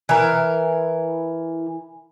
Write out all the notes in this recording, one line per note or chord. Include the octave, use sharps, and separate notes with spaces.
E3 A#4